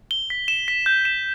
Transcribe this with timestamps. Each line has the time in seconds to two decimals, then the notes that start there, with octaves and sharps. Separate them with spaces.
0.11 G7
0.30 B6
0.48 E7
0.68 B6
0.86 G6
1.05 E7